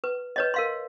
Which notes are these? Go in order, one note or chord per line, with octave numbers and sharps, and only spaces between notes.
B4
B4 C#5 D#5
A#4 F5 C6